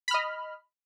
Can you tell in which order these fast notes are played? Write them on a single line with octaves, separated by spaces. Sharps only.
B5 F6 D#5